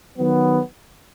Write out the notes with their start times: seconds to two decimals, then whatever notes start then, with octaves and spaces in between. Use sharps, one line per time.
0.18 D#3 F#3 B3